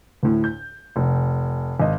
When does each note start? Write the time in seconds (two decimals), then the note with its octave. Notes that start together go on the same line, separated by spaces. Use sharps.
0.23 D2 A2
0.44 G6
0.96 F1
1.80 G#1 D#5